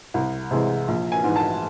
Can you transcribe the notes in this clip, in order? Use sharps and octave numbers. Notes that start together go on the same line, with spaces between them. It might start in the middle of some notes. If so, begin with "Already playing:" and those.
C2
C3 E3 G#3
A#1
G#5
G#2 E3
A5